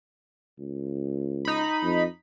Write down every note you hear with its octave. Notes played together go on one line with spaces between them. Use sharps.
C#2
D#4 B5
F2